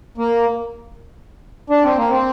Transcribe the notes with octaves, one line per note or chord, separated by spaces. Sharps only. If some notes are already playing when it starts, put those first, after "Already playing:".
A#3
D4
C4
A#3
C4